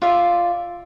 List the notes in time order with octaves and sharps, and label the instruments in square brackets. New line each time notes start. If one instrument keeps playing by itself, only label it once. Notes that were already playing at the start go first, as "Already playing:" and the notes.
[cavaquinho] F4 D5 E5